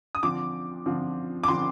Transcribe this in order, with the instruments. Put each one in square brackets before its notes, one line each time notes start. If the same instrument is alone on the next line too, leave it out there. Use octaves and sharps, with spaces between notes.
[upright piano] D#6
D3 F3 C4 D6
D3 F3 C4
D6
D3 F3 C4 C6